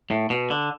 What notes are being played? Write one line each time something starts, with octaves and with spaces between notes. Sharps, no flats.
A2
B2
D3